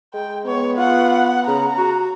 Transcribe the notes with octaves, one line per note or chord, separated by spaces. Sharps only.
G#3 G5
B3 C#5
F4 F#5
C#3 A#5
F#4